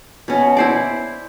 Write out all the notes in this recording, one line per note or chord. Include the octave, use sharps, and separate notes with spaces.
B2 C#4
E4 C5 D5